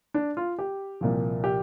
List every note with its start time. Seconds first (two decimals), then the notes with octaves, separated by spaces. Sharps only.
0.14 D4
0.37 F4
0.59 G4
1.01 C2 A#2 F3
1.44 G4